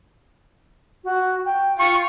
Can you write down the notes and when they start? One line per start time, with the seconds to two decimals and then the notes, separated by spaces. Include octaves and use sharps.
1.04 F#4
1.45 G5
1.79 F4 C#6